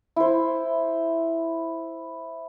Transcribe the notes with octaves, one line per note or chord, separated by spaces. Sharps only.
E4 C5